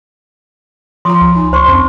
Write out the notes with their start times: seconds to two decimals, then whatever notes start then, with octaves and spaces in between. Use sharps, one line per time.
1.05 F3 F4 A#5 C6 D#6
1.21 C#2
1.36 D#4 G#5
1.53 C5 C6 C#6
1.68 F2 C4 C#4